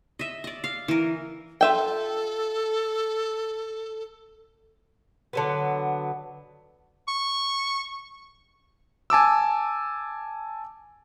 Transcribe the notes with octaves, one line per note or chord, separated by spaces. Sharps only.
D#5 E5
D5 D#5
F5
E3 A#4
F4 A4 E5 G5
D3 F#3 B3
C#6
G#5 A5 D6 E6